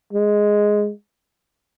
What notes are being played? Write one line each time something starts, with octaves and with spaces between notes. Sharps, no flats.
G#3